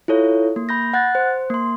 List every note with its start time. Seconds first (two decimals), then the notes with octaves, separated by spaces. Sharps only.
0.08 E4 F4 A4 C#5
0.56 A#3
0.69 B5 G6 A#6
0.93 F#5 F#6 A6
1.15 C5
1.50 A#3 C6